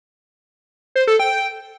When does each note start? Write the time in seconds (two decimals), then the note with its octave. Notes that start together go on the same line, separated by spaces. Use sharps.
0.96 C5
1.07 A4
1.19 G5